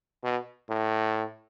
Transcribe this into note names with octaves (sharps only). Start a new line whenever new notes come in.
B2
A2